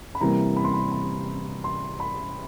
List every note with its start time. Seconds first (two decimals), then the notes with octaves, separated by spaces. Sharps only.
0.15 B5
0.21 C3 E3 G3 A#3 A#5
0.56 B5
0.64 C6
0.74 B5
0.92 B5
1.64 C6
2.00 B5